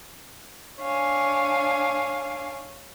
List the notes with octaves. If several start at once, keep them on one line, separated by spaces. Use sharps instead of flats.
D4 C#5 F5 G#5